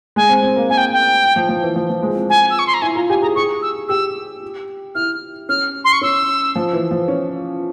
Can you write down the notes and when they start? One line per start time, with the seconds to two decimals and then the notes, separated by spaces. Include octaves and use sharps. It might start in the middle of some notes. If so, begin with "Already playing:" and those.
0.16 G#3 G#5
0.29 C4
0.43 C4
0.56 A#3
0.69 A#3 G#5
0.77 G5
0.93 G5
1.36 F3
1.49 F3
1.63 E3
1.76 F3
1.90 F3
2.03 G#3
2.16 C4
2.30 G#5
2.50 E6
2.59 C#6
2.67 C6
2.74 A#5
2.82 E4 G#5
2.95 F4 A#5
3.09 G4 G#5
3.22 G#4 A#5
3.35 G#4 C#6
3.62 E6
3.88 G4 E6
4.95 E4 F6
5.49 C#4 F6
5.84 C6
5.93 C#6
6.01 C#4 E6
6.55 F3
6.73 E3
6.91 F3
7.08 C#4